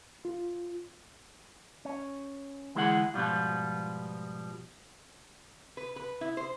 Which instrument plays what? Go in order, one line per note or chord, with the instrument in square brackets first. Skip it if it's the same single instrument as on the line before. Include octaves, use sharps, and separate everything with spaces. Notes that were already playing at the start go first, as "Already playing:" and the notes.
[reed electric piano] F4
[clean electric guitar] C#4
D2 E3 G#3 E4 G#4 F#5
G#2 B2 E3 F3 G3 F4
[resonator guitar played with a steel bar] B4
B4
E4
C5